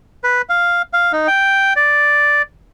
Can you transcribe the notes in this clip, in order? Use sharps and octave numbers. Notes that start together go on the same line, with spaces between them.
B4
F5
F5
D#4
G5
D5